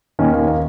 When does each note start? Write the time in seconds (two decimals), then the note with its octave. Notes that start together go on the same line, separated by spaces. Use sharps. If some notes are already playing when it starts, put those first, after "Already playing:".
0.19 D#2 D#3 C#4
0.33 A#3
0.47 A#3